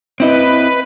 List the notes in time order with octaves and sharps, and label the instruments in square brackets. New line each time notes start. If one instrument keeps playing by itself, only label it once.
[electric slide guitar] C4 E4 D#5 [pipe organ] B4